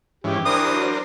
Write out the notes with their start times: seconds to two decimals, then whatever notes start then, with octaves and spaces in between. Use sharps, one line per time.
0.24 G#2 E3 C#4 G4
0.46 E3 D4 A#4 C5 D#6
0.71 F#3